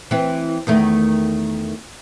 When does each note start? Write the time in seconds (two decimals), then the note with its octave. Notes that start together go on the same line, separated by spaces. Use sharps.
0.11 E3 C4
0.67 E2 D#3 A3